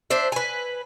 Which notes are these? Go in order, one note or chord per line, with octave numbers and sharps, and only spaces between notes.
D4 C5 E5
B4 G#5